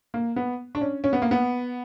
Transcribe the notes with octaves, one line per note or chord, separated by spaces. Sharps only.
A#3
B3
D4
C#4
C#4
B3
A#3
B3